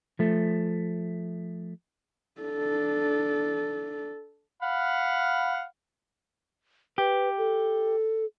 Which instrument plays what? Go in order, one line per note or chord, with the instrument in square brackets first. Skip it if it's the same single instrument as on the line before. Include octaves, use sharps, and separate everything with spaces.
[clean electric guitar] F3 A3
[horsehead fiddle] D4 A4
[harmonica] F5 F#5 B5
[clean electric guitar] G4 [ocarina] B4
[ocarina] A4